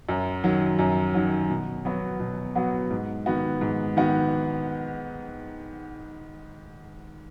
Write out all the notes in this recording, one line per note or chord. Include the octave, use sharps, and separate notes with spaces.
F#2
D#3 F#3
F#2
D#3 F#3
B2
F#3 B3 F#4
B2
F#3 B3 F#4
G#2
D#3 B3 F#4
G#2
D#3 B3 F#4